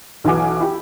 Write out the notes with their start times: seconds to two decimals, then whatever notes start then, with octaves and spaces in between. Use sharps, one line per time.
0.24 B1 E3 F#4 G#5 D6
0.60 E4 G4